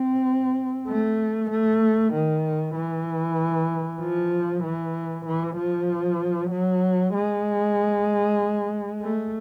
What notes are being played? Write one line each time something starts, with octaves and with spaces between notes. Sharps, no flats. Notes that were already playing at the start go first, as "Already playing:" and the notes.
Already playing: C4
A3
A3
D#3
E3
F3
E3
E3
F3
F#3
G#3
A3